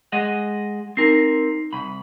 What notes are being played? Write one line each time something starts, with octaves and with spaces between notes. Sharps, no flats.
G#3 D#5 F#5
C4 D#4 A#4 C7
C2 B5